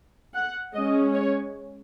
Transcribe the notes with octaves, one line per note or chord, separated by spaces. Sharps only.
F#5
G#3 C#4 D#5
C#5